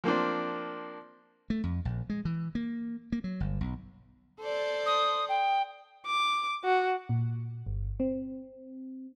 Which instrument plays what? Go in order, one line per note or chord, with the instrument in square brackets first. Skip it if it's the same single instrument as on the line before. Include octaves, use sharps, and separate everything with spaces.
[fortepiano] F3 A#3 C4 D4
[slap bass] A3
F2
A#1
G#3
E3
A#3
A#3
F#3
G1
B1
[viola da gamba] A4 C5 D5
[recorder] D#6
G5
[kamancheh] D6
F#4
[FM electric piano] A#2
G1
C4